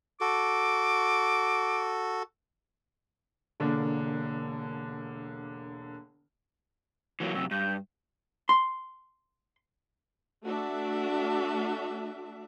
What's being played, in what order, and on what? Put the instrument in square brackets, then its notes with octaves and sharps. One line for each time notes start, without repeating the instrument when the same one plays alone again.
[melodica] F#4 A4 [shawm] D6
[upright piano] E1 D3 A#3 D4
[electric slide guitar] E3 F#3 A#3
[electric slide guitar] F#2 C3 [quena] E6
[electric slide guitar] G2 [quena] G6
[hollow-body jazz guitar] C6
[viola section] A3 D4 F#4 E5